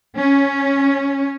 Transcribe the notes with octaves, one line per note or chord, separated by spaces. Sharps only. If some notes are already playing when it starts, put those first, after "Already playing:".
C#4